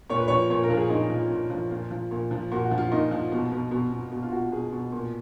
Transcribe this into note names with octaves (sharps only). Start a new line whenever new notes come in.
A#2 C#5
B4
F3 C#5
A#2 C#5
A#4
F3
G#4
A#2 D#4
F3
A#2
F3
A#2 F4
F3
A#2
F3
A#2 F#4
F#4
F3
F4
A#2 D#4
F3
B2
B2
B2
B2
B2
F4
B2 F#4
B2 G#4
B2
A#2